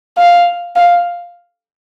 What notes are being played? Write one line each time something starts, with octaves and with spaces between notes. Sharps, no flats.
F5
F5